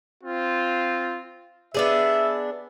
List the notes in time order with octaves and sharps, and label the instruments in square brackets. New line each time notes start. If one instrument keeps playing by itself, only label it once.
[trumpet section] C4 F4
[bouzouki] B3 D4 G#4 [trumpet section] E5